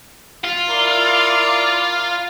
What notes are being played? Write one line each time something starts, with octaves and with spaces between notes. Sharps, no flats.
F4
E4 A#4 D5